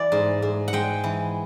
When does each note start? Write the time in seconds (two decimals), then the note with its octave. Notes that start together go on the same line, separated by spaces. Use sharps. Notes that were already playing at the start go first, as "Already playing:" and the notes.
Already playing: E3 D5
0.12 G#2
0.42 G#2
0.68 F#5
0.73 G#3 G5
1.04 E3